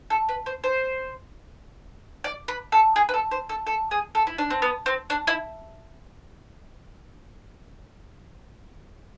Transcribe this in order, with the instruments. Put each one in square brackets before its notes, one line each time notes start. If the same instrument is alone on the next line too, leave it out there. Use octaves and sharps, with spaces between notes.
[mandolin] A4
B4
C5
C5
D5
B4
A4
G#4
B4
A4
C5
A4
A4
G#4
A4
E4
D4
C4
B3
C4
D4
E4